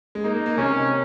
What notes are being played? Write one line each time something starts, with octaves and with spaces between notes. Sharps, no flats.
G#3
A#3 D#4
A#3
A#3
C3 C#4